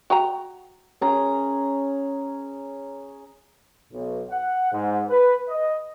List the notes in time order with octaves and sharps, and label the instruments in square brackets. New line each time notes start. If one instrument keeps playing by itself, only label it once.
[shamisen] F#4 G5 A#5
[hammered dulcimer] C#4 G#4 A#5
[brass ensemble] B1
F#5
G#2
B4
D#5